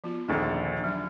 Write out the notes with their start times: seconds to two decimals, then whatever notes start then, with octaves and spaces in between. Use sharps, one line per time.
0.04 F3 B3 F4
0.28 A#1 D#2 D3 G#4 A4
0.84 F#3 D4